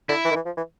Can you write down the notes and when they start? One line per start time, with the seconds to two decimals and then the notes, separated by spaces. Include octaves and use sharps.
0.09 D3 E4
0.25 E3
0.31 D#3
0.35 E3
0.46 F3
0.57 E3